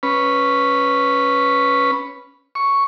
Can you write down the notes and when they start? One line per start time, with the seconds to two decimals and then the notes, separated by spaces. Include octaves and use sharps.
0.03 C#4 B4
2.55 C#6